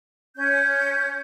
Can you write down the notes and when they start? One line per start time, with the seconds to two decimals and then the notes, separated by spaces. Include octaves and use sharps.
0.37 C#4 G6